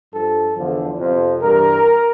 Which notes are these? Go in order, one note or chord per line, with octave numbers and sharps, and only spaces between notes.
G2 F3 A4
E2 D3 F3
F2 C3 F3
G2 E3 G3 A#4